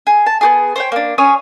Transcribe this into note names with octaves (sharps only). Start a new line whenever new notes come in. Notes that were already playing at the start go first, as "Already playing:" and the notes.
G#4
A5
B3 G4 G#4
C5 C#5 G5
A#3 D4
C#4 G#4 C#5 D#6